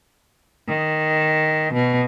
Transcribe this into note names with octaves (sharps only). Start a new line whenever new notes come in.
D#3
B2